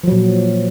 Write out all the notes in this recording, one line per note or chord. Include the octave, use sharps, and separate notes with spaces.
A#2 F3 F#3